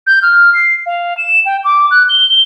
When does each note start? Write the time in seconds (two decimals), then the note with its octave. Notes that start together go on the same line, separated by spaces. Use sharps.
0.07 G6
0.22 F6
0.54 C7
0.86 F5
1.18 E7
1.45 G5
1.64 D6
1.91 F#6
2.09 G7
2.29 G7